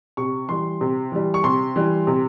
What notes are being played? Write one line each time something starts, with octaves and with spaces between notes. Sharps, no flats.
C3 C#6
E3 G3 C6
C3
E3 G3
C#6
C3 C6
E3 G3
C3